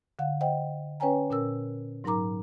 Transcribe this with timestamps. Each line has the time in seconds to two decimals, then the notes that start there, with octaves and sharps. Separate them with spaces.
0.19 D3 F5 F#5
0.41 C5 D#5 F#5 G5
1.00 C#4 B4 C#5 G5 G#5 A#5
1.30 A#2 C#4 A#4 E6
2.04 G#2 F#3 D#4 A#4 A#5 D6